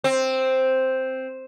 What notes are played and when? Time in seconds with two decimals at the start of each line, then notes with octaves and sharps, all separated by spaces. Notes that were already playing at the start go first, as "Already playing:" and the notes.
0.04 C4